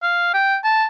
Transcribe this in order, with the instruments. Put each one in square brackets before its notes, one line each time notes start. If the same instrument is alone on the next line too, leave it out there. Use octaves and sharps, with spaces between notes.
[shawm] F5
G5
A5